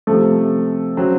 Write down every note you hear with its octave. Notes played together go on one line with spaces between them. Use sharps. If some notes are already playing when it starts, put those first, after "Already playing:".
C3 F3 A3
C#3 F#3 C4